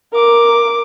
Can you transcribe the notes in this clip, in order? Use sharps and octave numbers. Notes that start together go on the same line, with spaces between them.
A#4 D6